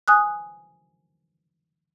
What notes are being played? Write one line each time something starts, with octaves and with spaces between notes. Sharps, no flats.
G#5 D#6 F#6